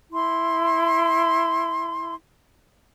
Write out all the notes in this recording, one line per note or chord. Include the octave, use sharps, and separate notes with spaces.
E4 C6